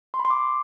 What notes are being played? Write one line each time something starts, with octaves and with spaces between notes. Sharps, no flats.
C6
B5
C6
D6